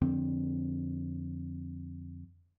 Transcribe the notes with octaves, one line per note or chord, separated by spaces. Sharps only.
F2 D3 C4